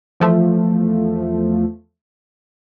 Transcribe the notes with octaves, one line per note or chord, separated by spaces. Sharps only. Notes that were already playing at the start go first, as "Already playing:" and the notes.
E2 F3 A3